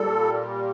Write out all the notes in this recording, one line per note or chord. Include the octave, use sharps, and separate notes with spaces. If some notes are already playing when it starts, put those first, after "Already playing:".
Already playing: A#2 G3 A4